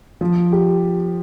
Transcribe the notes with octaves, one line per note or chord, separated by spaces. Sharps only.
F3
G4